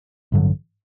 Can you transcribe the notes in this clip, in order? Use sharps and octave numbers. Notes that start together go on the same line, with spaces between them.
A1 G2 D3 F#3